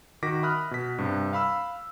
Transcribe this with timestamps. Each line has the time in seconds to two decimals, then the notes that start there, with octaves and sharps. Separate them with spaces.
0.23 D#3 F#4 D6 A#6 B6
0.43 E5 B5 D#6 F6 F#6
0.71 B2 B6
0.98 G2 C3
1.33 F5 B5 E6